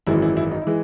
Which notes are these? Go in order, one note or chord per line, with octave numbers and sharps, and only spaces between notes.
G#1 F#2 E3 G#3 E4
E4
E4
D#4
E4
E3 G#3